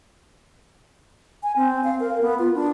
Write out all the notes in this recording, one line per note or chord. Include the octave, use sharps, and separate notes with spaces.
G#5
C4
F5
A#4
B3
F4
D4